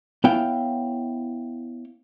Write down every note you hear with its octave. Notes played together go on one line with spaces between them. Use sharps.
B3 E4 C#5 F5 G5